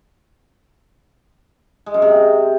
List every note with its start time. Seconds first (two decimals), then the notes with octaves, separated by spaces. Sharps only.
1.86 G#3
1.94 F#2
2.02 C3